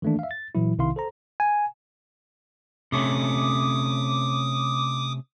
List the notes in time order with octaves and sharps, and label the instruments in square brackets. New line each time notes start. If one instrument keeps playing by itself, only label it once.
[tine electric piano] D#3 E3 A3 A#3 D4
E5 F5
A6
A#2 E3 F#3 E4
B1 C3 D#3 E4 F5 C6
A4 C5 A#5
G#5
[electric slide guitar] C3 A3 C#4 [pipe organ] D6 D#6